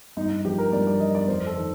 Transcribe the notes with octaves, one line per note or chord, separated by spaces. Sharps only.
G2 D#4
D#4
F3 G4
A#4
G2 D5
D5
F3 D#5
D5
F2 C5
A4
D#3